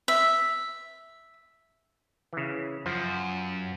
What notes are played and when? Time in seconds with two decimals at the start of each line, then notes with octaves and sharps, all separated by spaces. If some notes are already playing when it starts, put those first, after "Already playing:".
0.08 E5
2.33 C#3 E3
2.86 F#2 F3